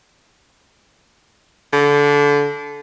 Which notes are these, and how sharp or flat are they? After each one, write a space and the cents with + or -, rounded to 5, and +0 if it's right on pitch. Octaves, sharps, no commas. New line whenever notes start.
D3 -25